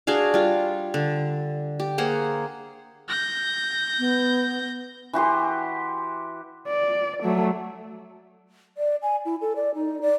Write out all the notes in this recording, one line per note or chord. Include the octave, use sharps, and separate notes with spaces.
D4 F#4 G#4 F5
G3 F4
D3
G4
A#3 G#4 C5 F#5
G6 A#6
B3
E3 F#4 G4 C6
D5
F#3 A3
D5
G#5
E4
A4
D5
D#4
D5